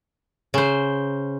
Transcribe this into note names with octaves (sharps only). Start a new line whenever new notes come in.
C#3 C5